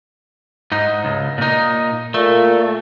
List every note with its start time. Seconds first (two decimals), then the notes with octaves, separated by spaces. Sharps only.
0.72 G#2 D#4
1.05 C#2
1.38 A#2 D#4
2.14 A#2 A3